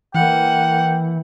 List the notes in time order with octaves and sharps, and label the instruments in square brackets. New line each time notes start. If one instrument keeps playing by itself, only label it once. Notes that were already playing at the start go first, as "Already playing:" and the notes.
[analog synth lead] E3 [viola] A#3 F#5 [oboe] G5